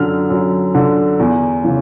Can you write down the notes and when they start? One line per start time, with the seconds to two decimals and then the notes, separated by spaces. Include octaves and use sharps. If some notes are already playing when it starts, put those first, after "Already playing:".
Already playing: F#2 D3 F6
0.30 F#2
0.75 D3
1.19 E2
1.64 C#3 E3